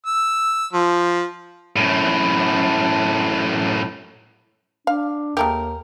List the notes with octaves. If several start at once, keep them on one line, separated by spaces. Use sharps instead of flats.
E6
F3
F#2 A2
D4 F5
D#2 G#3 A3 G4 A#4